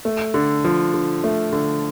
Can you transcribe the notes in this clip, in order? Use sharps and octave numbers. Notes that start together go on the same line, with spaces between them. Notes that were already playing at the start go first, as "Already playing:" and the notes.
A3
D3
F3
D3
A3
D3